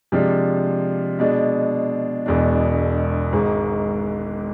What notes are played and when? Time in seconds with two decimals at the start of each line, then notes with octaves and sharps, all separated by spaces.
0.12 C3 F3 G#3 D4
1.19 B2 G#3 D4
2.26 E1 E2 B2 G#3 D4
3.33 G#1 G#2 G#3